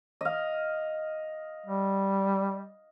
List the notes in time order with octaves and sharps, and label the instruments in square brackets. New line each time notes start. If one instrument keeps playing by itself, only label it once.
[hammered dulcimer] D#5 F5
[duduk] G3